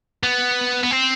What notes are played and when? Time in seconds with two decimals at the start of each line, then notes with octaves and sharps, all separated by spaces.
0.24 B3
0.84 B3
0.91 C4